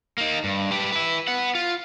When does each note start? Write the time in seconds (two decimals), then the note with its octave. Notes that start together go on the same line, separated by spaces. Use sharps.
0.18 A#3 D#4
0.44 G2
0.71 G4 B4
0.92 E4 B4
1.28 B4 F#5
1.55 F4